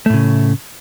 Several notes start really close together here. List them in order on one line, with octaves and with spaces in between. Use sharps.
A3 A2 C#3